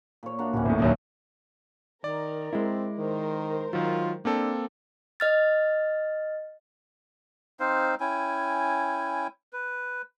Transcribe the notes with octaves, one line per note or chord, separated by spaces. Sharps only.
A#2 C#5
A#3 D4 F#4
D1 C#4 E4 F#4
G#1 E2 A2
A#1 D#2 F#3
D#3 A#4 D5
G#3 C4 E4
D#3 A#4 C5
D#3 F#3 F4
A#3 C4 D4 A4
D#5 F6 A6
C4 D#4 C5 F5
C#4 E4 G5 G#5
B4